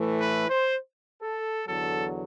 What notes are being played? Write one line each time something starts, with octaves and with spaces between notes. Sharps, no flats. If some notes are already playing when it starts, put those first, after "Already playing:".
Already playing: A2 E3 A3
B4
C5
A4
E2 D3 F#3 A4